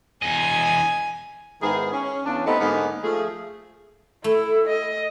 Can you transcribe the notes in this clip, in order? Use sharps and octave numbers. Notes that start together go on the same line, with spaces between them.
E2 D#5 G#5
G#2 D#3 B3 E4 G#4
C#4
E2 C#3 D4
A3 B3 C4 D#4 G4 A4
G#2 D3 A#3 B3 D#4
F3 A3 G#4
A3 E4 A4
D#5